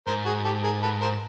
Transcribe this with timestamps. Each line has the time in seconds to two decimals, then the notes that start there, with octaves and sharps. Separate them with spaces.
0.07 G#2 A#4 C5
0.25 F#4 G#4
0.45 G4 A4
0.63 G#4 A#4
0.83 A4 B4
1.01 A#4 C5